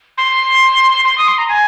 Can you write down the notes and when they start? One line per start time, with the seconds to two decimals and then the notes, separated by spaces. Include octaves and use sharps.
0.18 C6
1.05 C6
1.18 D#6
1.28 C6
1.38 A#5
1.49 G#5